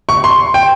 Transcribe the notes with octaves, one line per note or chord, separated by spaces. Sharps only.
C#6
C6
G5